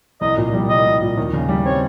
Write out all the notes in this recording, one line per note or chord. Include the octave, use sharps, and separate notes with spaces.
C2 D#5
A#2
G3
C2 D#5
C2
A#2
D#2
C#3
G3
C4 C#5